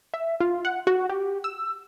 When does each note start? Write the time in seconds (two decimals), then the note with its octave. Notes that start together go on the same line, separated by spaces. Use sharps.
0.14 E5
0.40 F4
0.65 F#5
0.87 F#4
1.09 G4
1.44 E6